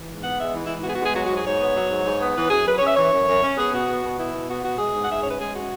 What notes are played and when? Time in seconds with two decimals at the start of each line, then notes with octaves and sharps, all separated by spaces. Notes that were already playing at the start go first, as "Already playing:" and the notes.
Already playing: E3
0.08 G#2
0.23 B3 F#5
0.38 G#3 E5
0.53 E3
0.63 E4
0.68 G#2
0.84 B3 F#4 G#4
0.94 F#4
0.99 G#3 G#4
1.14 F#3 F#4
1.24 F#4
1.29 G#2
1.35 G#4
1.45 G#2 C#5
1.60 B3
1.75 F#3
1.91 G#2
2.05 G#2
2.20 B3
2.36 E3 B4
2.51 F#2 G#4
2.65 F#2 B4
2.77 C#4 C#5
2.86 E5
2.96 E3 C#5
3.12 F#2
3.27 F#2
3.42 C#4
3.57 B3 G#4
3.72 B2 F#4
3.87 B3
4.03 B2
4.18 B3 E4
4.33 B2
4.48 B3 F#4
4.63 B2 F#4
4.78 G#3 G#4
4.93 G#2
5.02 F#5
5.08 G#2 E5
5.21 C#4 C#5
5.29 B4
5.38 G#3 G#4
5.54 F#4